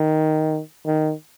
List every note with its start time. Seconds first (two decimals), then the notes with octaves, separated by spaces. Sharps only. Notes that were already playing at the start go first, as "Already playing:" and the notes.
Already playing: D#3
0.86 D#3